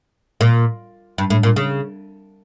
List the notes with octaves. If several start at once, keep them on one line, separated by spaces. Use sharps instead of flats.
A#2
G2
A2
A#2
C#3